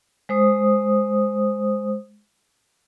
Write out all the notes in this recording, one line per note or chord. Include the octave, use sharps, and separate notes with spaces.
G#3 C5 D#6